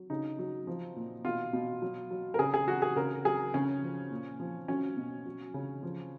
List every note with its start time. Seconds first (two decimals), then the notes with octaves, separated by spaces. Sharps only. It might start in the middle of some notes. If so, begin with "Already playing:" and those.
Already playing: F#3
0.10 C#3 D#4
0.39 F#3
0.67 F3
0.96 A#2
1.25 B2 F4
1.53 B2
1.82 F#3
2.11 F#3
2.34 A#4
2.39 C#3 G#4
2.54 G#4
2.68 F#3 F#4
2.82 G#4
2.96 C#3 A#4
3.25 F#3 G#4
3.54 C#3 C#4
3.82 F3
4.11 A#2
4.40 F3
4.68 F#3 C#4
4.97 B2
5.26 F#3
5.54 C#3
5.83 F3